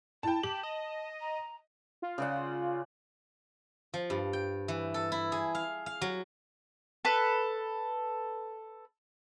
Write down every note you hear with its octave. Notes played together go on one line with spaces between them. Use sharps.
E4 G5 A5
G4 A5 F#7
D#5
A#5
F4
C#3 D5 F#5
F3
G2
G5
E3
A4
E4
G#4
F5
F5
F#3
A4 B4